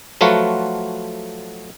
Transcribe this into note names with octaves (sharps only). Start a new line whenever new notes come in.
F3 F#3 A3 F4 F#4 B4